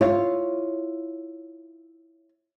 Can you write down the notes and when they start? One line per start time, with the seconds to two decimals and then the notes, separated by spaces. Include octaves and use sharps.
0.01 E4 F4 C#5